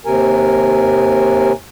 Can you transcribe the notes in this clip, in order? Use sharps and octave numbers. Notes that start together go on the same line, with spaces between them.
D#2 C3 A#4 G#5